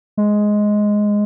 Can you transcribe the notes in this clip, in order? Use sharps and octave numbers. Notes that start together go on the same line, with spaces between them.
G#3